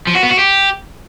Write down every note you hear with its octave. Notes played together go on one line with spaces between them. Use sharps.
F3
F#4
B3
F#4
G4